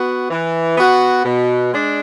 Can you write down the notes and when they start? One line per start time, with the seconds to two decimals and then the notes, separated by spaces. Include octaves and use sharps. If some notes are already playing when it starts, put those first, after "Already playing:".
Already playing: B3 F#4
0.30 E3
0.77 B3 F#4
1.24 B2
1.71 G#3 D4